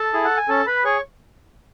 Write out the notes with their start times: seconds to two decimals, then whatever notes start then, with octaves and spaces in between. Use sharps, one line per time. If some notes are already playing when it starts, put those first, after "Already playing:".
Already playing: A4 A5
0.13 E4 G#4
0.24 F#5
0.37 G#5
0.49 C#4 A4 A5
0.67 B4 B5
0.85 G#4 C#5 C#6